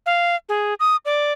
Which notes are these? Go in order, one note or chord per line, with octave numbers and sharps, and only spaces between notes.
F5
G#4
D#6
D5